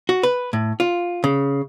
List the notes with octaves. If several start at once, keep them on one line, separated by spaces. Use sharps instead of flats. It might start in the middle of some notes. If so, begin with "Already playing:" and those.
F#4
B4
A2
F4
C#3